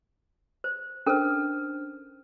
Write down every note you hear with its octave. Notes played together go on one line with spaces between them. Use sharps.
C5
C#4 D4 A4 A#4 C5 F6